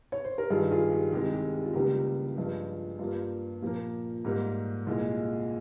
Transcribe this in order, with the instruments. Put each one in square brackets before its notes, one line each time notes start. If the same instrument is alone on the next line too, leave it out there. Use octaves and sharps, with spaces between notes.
[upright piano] C#5
C5
A#4
G2 D#3 G3 F4 G#4
F4 G#4
G4
C2 C3 D#3 G#3 G4
G4
G4
F4
C#2 C#3 G3 A#3 G4
G2 F3 G#3
G2 G3 A#3 F4
A#2 F3 A#3
G#2 G3 A#3
C2 A#2 G#3